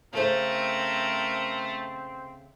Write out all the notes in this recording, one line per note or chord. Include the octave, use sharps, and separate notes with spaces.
C#3 A3 C4 A4 A#4 C5